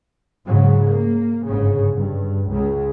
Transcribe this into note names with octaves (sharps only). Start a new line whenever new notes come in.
G#2 C#3 F#3
A#3
G1 G#2 C#3
G2
C#2 C#3